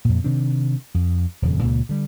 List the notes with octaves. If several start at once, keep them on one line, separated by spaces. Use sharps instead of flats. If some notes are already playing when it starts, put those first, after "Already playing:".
F2 A#2
C3 D#3 C4 D4
F2
D#1 F2 C#3
C#2 A#2 C#3
D3 G3